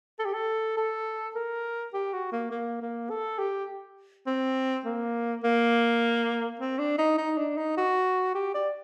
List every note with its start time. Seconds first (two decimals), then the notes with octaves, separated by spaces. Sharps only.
0.19 A4
0.25 G4
0.34 A4
0.77 A4
1.35 A#4
1.94 G4
2.13 F#4
2.32 A#3
2.51 A#3
2.81 A#3
3.10 A4
3.39 G4
4.26 C4
4.85 A#3
5.43 A#3
6.59 C4
6.79 D4
6.98 D#4
7.18 D#4
7.38 D4
7.57 D#4
7.77 F#4
8.35 G4
8.54 D5